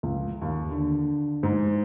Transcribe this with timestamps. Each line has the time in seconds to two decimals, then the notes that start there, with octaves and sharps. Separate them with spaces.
0.03 C#2
0.42 D#2
0.71 D3
1.43 G#2